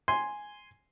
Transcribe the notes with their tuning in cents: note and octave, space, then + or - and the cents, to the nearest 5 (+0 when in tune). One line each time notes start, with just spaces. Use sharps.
G#5 +0 C6 +0